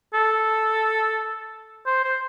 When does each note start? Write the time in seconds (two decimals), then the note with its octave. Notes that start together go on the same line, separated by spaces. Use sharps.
0.14 A4
1.86 C5
2.04 C5